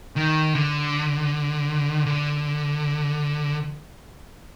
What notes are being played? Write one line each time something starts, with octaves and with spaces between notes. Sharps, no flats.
D#3
D3
D3